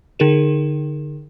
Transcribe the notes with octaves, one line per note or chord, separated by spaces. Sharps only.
D3 D#4 G#4 A#4 E7